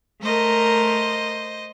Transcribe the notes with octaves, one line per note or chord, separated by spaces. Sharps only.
A3 A#4 C5 D#5